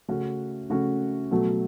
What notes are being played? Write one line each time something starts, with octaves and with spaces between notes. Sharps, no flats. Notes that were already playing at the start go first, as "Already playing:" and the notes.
C#3 A3 C#4 F#4
C#3 A3 C#4 F#4
B2 F#3 A3